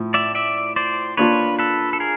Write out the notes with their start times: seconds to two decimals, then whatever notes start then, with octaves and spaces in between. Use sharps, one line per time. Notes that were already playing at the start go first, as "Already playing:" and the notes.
Already playing: A2 F3
0.14 D5 E5
0.35 D5 E5
0.76 C5 D5
1.17 A#3 D4 F4 B4 C#5
1.59 A4 B4
1.93 A4
2.00 G#4 A#4